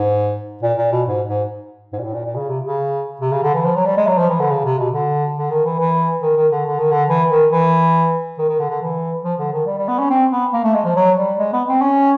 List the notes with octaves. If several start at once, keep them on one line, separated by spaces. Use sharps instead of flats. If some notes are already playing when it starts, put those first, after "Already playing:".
Already playing: G#2
A#2
A#2
B2
G#2
G#2
G#2
A#2
A2
A#2
A#2
C#3
C3
C#3
C3
C#3
D3
E3
F3
F#3
G3
G#3
F#3
F3
E3
D3
C#3
C3
B2
D3
D3
D#3
E3
E3
D#3
D#3
D3
D3
D#3
D3
E3
D#3
E3
D#3
D#3
D3
D3
E3
F3
D3
D#3
G3
G3
B3
C#4
C4
B3
A#3
A3
G#3
F3
F#3
G3
G#3
B3
C4
C#4